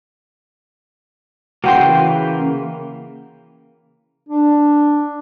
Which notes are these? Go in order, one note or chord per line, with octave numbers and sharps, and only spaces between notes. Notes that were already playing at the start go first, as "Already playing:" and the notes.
C#3 E3 A#3 F#4 G5 C6
D4